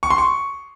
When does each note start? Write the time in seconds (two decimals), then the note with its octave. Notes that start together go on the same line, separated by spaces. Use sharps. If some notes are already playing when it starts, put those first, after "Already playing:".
0.03 C#6
0.10 C6
0.18 C#6